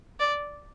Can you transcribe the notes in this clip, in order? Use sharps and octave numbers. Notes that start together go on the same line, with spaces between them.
D5